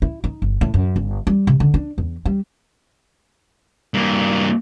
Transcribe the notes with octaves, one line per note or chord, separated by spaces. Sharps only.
E4
D#4
G1
A2
F#2
G1
G3
C3
D3
D4
E2
G3
G2 A#3